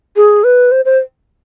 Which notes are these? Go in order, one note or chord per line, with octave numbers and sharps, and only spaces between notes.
G#4
B4
C5
C5